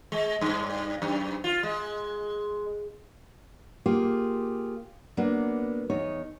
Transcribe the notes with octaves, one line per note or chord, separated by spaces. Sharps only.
G#3
G2
F#2
F4
G#3
A#3 F4 G4 G#4
F#3 A#3 B3 D4
E2 D#4 C#5